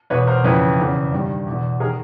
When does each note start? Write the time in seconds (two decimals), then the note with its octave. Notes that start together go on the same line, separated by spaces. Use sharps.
0.10 E2 B2 B4 C#5
0.27 A#4 C5
0.44 F2 C#3 E3 B4 C#5
0.78 E2 C#3 E3
1.12 G2 D#3
1.46 E2 B2
1.80 G#4 A#4
1.84 D#3